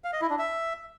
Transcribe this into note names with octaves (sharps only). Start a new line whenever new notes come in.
F5
D#5
E4
D4
E5